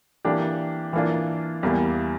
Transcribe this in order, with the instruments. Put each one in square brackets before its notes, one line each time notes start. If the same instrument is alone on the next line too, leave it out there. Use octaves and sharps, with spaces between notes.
[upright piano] E3 A#3 D4 G4
E3 A#3 D4 F4
E2 E3 G3 A#3